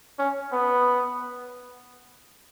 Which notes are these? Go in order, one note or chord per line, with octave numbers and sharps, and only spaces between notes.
C#4
B3